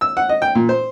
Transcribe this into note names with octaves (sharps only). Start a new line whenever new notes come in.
E6
F#5
D#5
G5
A#2
C5